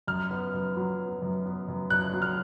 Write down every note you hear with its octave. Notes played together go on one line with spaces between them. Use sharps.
F#2 F6
B3
F#2
F#3
B3
F#2
B3
F#2
F#2 F#6
F#3
F6